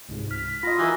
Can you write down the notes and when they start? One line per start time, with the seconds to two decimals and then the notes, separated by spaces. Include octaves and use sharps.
0.09 C#2 G#2 C3
0.31 F6 B6
0.63 F4 D#5 B5 C6 A#6
0.78 E3 F#4 A#4 G#5 D#6 E6